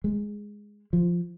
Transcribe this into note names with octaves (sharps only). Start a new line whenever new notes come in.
G#3
F3